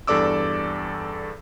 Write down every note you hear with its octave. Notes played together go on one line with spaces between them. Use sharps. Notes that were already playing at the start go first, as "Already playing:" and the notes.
E2 G2 A4 D5 D6 E6